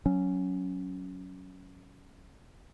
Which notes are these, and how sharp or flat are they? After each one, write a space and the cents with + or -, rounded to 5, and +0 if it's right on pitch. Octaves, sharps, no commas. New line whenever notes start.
F#3 +0 C#4 +0